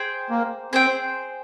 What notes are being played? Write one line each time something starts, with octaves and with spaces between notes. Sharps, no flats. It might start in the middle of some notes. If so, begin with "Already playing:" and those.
Already playing: G#4 C5 G5
A#3
C4 G#4 C5 G5